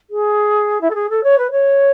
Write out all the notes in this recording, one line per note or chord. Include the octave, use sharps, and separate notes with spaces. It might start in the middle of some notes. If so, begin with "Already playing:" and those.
G#4
E4
A4
G#4
A4
C#5
B4
C#5